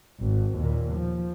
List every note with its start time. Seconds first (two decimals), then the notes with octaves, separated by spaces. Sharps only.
0.20 G#1
0.57 D#2 A#2
0.95 F3